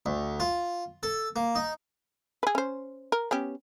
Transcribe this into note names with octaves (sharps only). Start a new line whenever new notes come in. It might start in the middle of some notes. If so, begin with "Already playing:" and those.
D2
F4
A4
A#3
D#4
G#4 B4
C#4 C5
A#4
B3 C#4 G4